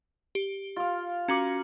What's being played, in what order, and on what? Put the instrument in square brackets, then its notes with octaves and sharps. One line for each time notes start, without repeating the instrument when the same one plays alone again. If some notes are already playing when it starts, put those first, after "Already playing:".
[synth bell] G4
[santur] F4 F5
[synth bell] C#4 F#4 D6 [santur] A#4